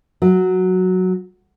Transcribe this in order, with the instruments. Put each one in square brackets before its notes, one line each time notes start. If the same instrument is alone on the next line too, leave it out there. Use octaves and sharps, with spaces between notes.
[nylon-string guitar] F#3